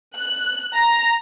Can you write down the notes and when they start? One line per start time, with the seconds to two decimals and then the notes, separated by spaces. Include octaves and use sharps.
0.15 F#6
0.75 A#5